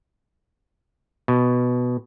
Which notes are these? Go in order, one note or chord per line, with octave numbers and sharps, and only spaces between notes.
B2